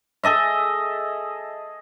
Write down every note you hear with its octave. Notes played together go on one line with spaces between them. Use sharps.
G#4 A4 D#5 E5